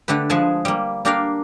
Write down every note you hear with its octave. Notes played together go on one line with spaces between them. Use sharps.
D3 A3 G4 B4
F3 G#3 G#4 B4 G#5 A5
G3 A#3
A#3 D4 G4 A#4 D5 F5